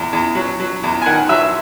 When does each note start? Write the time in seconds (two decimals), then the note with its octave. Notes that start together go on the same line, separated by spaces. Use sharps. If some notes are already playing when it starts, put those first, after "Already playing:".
Already playing: E2
0.13 E2
0.35 F#3
0.60 F#3
0.83 E2
1.02 G#5
1.06 D#3 F#5
1.29 F#3 E5